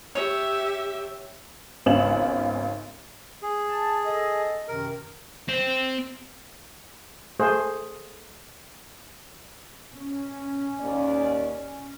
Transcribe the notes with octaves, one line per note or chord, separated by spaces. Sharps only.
G4 C#5 E5
G#1 C#2 B3 C#4 E7 F#7
G#4
A5
A4 D#5
F#2 C3 D#3 A#4
C4 C5
A3 G#4 C5
C#4
D#2 D5